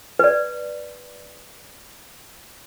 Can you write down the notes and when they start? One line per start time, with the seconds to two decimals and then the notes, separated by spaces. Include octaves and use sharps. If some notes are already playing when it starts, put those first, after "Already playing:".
0.19 B4 D5